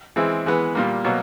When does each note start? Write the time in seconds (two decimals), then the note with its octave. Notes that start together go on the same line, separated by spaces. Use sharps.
0.16 E3 G#3 C4 E4
0.46 E3 G#3 B3
0.75 A#2 G3 A#3
1.05 B2 F#3 A#3